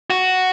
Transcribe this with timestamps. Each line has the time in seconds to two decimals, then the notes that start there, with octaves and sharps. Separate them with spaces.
0.10 F#4